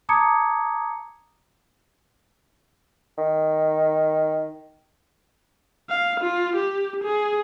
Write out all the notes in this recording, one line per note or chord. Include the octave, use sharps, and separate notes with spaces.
A5 A#5 D6 D#6 G#6 C#7
D#3
F5
F4
G4
G#4